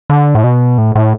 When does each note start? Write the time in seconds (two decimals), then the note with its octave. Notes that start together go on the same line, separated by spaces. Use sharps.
0.10 D3
0.35 A2
0.44 B2
0.78 A2
0.95 A2